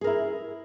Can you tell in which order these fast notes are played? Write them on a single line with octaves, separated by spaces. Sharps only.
G#4 A#4 E4